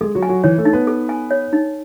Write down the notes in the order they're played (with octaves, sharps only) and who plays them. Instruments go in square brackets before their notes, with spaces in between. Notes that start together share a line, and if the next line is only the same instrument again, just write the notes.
[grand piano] G#3 G#4 [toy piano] A4
[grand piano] F#3 F#4
[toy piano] G#5
[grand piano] F#3 F#4
[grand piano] E3 E4 [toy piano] C#5
[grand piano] A3 A4
[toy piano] D#4
[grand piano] B3 B4
[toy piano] A4
G#5
C#5
D#4